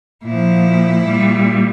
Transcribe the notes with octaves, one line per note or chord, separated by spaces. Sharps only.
A#2 F3 E4
A#2 G3